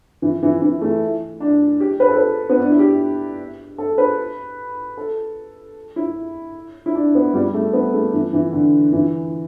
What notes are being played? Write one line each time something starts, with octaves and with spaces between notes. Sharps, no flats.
E3
E3
E3
A3
D4
G4
B4
A4
B4
B3
D4
E4
G4
A4
B4
A4
E4
E4
D4
B3
G3
A3
B3
A3
E3
E3
D3
E3